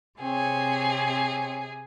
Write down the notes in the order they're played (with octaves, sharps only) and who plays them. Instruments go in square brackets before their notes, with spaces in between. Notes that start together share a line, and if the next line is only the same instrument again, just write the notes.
[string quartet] C3 G#4 [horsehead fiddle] C4 C#5